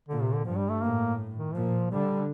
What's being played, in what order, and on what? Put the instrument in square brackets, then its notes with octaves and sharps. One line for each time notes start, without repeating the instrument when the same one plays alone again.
[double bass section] A#2 [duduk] D3
[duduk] C3
D3
[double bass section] G2 [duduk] F3
[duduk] G3
A3
[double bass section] A2 [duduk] A#3
[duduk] D#3
[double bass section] A#2 [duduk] F3
[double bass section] D3 [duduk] G3